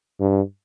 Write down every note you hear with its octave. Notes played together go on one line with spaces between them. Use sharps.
G2